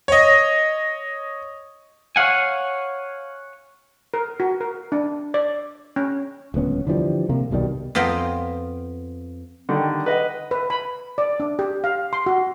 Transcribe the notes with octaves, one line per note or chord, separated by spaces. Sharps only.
C#5 D#5
C#5 D#5 F5 F#5 G#5
A#4
F#4
A#4
D4
D5
C#4
D1 C#2 B3 C#4
D3 E3 F3 G3
C3 A#3
C2 B2 D#3 G3
F2 B3 F4 G5 A#5
D3 D#3 G3
B4 D#5 F#5
B4
B5
D5
D4
G4
F5
C6
F#4